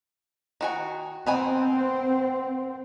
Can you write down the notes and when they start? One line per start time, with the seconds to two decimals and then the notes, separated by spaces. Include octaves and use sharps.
0.61 D#3 F#4 G#5
1.27 D#3 B3 C4 G#5